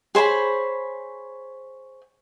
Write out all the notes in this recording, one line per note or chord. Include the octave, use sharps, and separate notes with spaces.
G#4 C5 C#5 B5